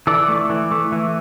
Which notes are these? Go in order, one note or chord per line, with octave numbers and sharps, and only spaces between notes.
E3 A4 D5
A3
E3
A3
E3